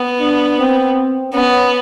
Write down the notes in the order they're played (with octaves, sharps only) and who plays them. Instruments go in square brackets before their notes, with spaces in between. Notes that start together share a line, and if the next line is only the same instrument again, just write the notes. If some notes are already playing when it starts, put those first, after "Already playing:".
Already playing: [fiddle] B3
[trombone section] D4
C4
[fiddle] B3 [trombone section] C#4